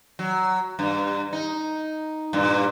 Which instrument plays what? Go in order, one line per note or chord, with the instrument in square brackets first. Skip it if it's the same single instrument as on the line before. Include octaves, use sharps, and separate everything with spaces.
[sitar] F#3
G2
D#4
G2 A#2